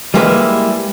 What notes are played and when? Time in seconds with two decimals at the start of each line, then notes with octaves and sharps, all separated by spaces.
0.14 G3 G#3 A#3 E4 G#4 B4